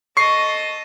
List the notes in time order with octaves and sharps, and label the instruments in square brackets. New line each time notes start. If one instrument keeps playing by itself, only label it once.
[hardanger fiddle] A4 D#5 [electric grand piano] C#6 C7